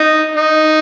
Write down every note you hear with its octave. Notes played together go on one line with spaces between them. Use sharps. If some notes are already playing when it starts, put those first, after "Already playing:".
Already playing: D#4
D#4